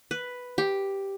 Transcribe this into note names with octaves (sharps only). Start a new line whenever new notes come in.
B4
G4